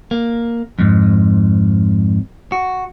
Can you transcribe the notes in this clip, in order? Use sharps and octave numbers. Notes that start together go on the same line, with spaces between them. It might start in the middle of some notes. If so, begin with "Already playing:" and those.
A#3
F2 G#2
F#4